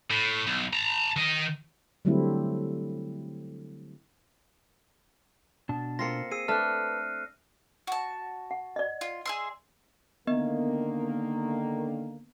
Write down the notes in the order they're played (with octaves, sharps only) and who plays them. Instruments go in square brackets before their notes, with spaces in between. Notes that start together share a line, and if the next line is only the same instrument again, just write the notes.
[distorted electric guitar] A2
B1
A5 A#5
D#3 D#5
[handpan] D3 F#3 G3 A3 C4 E4
[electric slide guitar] B2 D4 A5
[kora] A#3 C4 F4 [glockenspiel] A#6 C7 C#7
[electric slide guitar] G#4 [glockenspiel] E6 C7 D#7
[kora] A3 D4 [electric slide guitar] B4 A5 [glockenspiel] F6 F#6
[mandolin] F#4 A5
[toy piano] F#5
D5 D#5
[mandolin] F4
G#4 E5 C6
[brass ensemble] D3 D#3 A#3 [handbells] B3 D#5